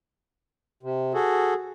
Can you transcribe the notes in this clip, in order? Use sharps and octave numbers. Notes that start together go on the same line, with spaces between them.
C3
F#4 G#4 A4